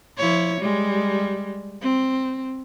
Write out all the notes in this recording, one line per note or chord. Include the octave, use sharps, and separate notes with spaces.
F3 E4 C#5
G3 G#3
C4